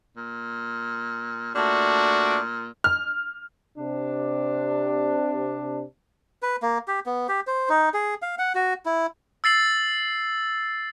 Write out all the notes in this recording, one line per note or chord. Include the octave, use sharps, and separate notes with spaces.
A#2
A#2 A3 D4 F#4
F6
C3 D4
B4
A#3
G4
B3
G4
C5
D#4
G#4
F5
F#5
F#4
E4
E6 A6 C7 F#7